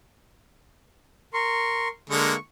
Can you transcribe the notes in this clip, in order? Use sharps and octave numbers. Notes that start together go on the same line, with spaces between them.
A#4 C6 C#6
D3 G#3 A#3 C#6